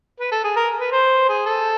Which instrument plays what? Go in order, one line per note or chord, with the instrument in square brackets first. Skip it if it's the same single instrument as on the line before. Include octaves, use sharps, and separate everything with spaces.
[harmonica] B4
A4
G#4
A#4
B4
C5
G#4
A4